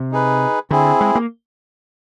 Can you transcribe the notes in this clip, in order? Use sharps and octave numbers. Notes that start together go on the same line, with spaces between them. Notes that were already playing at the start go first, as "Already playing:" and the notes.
Already playing: C3
D#4 G#4 B4
D3 C4 E4 G#4
G#3
A#3